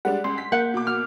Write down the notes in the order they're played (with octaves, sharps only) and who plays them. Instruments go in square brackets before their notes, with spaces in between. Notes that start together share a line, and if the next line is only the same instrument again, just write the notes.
[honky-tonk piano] G3 G#3 D4 [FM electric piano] F#5
[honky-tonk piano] C#2 [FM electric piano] C6
[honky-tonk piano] B6
[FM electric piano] A#3 [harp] F#5 [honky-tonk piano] G6
[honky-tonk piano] B2 D6
[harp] F6